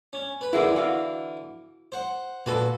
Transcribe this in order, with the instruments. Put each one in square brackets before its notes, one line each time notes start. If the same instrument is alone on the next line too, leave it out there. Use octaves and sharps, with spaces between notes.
[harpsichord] C#4
B4
[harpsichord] D3 E3 [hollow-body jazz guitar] E4 G#4 A#4
[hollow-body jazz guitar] E4 F#4 F5
[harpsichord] C5 F#5
[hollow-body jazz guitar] A#2 F#4 A4 [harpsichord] B4 C6